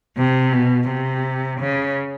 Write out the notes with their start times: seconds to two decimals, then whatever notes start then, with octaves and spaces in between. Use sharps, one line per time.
0.17 C3
0.53 B2
0.89 C3
1.60 C#3